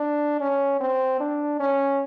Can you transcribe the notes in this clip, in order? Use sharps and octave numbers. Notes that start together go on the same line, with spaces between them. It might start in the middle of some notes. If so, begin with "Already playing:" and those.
Already playing: D4
C#4
C4
D4
C#4